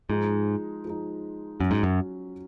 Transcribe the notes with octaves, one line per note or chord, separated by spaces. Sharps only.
G#2 F3 G#3 D#4
F3 G#3 D#4
F#2 F#3 C#4 F#4
G#2
F#2